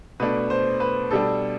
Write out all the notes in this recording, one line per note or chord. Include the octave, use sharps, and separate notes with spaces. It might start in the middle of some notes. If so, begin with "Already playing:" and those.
B2 A3 D4 B4
C5
B4
B2 G3 D4 A4